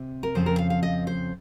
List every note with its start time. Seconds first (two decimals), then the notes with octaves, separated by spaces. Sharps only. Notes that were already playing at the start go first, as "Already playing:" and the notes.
Already playing: C3 C4
0.23 A#4
0.35 F2 C#3 F3 C4 C5
0.46 A#4
0.58 F5
0.70 F5
0.83 D#5
1.07 C5